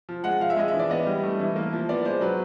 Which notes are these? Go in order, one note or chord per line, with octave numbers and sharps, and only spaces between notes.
F3
G#3 F#5
F3 F5
E5
G#3 D#5
E5
E3
D5
B3 D#5
G3
A3
E3
A#3
F3
B3 D5
G#3 C5
F#3 B4